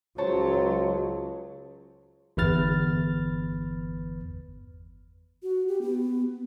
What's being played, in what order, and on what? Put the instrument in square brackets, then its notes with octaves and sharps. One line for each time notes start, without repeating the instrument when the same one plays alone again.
[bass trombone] C#2 [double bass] F#3 [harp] C5 C#5 A5
[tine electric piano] G1 E2 B4 F6 A6
[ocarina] F#4
G4
B3